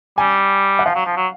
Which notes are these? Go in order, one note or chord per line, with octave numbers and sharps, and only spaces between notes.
G3 G#5
F#5
F3 F5
F#3
F3
F#3